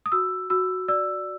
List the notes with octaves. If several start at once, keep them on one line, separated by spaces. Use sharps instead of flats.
D#6
F#4 E6
F#4 E6
D5 E6